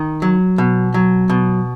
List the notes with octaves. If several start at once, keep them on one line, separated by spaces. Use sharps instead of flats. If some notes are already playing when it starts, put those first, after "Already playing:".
Already playing: D#3
F#3
B2
F#3
B2